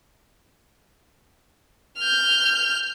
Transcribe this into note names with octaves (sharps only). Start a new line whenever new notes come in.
F6 G6